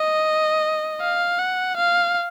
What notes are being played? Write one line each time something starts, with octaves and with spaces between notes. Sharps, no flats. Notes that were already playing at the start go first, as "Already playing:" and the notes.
Already playing: D#5
F5
F#5
F5